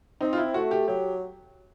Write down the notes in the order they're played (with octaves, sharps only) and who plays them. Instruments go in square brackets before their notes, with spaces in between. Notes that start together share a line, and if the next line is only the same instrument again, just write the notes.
[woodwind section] C4 [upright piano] D#4
[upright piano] F4
E4
[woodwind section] A3 [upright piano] F#4
[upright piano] G4
[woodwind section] F#3 [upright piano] G4